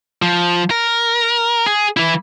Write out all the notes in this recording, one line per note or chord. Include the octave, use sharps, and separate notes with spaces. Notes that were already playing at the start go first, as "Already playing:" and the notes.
F3
A#4
G#4
E3 E4